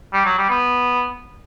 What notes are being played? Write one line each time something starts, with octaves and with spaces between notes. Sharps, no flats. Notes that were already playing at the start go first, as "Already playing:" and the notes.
G3
F#3
G3
B3